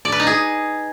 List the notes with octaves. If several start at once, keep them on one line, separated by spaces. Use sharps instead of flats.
D5
B4
D#4
G#4